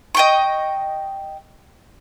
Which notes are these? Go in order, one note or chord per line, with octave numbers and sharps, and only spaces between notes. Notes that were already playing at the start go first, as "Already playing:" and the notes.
D#5 G5 C#6